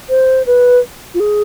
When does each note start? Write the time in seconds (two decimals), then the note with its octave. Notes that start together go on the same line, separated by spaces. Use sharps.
0.10 C5
0.47 B4
1.14 F4
1.20 G#4